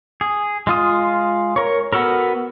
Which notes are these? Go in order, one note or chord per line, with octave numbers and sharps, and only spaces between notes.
G#4
G#3 F4 D#6
A#4 C#5
B3 F#4 A4 A#4